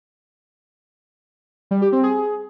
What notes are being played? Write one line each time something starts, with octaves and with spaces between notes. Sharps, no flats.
G3
G4
C4
G#4